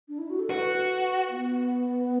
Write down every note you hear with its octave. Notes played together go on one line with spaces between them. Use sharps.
D4
E4
F#4
A4
F#4 B4
B3